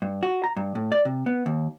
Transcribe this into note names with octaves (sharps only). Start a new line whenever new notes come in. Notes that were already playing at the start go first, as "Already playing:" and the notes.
G2
F#4
A#5
G2
A2
D5
C3
B3
D#2